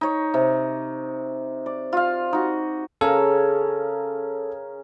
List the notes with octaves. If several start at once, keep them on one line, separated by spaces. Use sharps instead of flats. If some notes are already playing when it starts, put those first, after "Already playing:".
D#4 C#5
C3
D5
F4 F5
D#4 F#4
C#3 A4 A#4